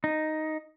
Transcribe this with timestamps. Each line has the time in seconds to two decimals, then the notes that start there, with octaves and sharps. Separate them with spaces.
0.04 D#4